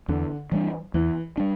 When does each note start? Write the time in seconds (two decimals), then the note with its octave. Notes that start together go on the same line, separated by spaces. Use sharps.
0.08 E2 D3
0.52 E3 G3 D4
0.94 E2 E3
1.37 G3 D4